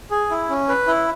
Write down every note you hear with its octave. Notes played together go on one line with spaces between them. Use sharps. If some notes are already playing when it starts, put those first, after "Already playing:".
G#4
E4
C#4
B4
E4